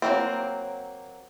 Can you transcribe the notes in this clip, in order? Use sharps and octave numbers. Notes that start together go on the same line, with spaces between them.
F#3 G3 A#3 C4